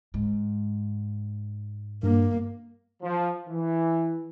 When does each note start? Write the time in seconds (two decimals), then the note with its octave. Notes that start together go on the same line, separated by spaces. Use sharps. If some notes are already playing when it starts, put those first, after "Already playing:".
0.14 G#2
2.03 G2 A#3
3.02 F3
3.48 E3